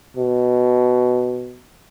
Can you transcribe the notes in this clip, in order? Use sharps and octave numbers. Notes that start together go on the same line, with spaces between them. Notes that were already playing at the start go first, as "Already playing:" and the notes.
B2